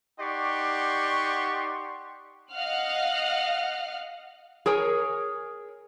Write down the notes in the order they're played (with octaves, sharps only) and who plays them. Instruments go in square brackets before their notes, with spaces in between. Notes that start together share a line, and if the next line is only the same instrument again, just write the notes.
[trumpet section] D#4 G4 D5 F#5 C6 C#6
[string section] D#5 F5 F#5 F6 F#6
[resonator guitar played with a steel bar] G#4 A#4 C#5 G#5